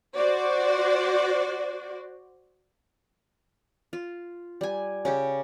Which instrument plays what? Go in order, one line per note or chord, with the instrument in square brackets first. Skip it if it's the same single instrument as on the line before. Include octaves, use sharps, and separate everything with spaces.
[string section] F#4 C5 D5
[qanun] F4
G3 G#5
C#3 C#4 G4